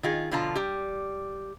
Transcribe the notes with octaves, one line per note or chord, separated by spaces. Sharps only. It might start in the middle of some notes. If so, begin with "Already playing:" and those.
D#3 F4 G#4
B2 D3 F3 F4 A5 A#5
G3 G4